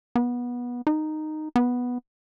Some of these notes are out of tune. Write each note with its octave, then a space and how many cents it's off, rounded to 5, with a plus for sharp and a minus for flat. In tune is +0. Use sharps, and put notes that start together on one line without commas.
B3 -20
D#4 -10
B3 -5